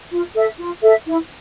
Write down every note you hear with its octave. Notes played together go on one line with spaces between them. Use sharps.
F4
A4 E5
F4
A4 E5
E4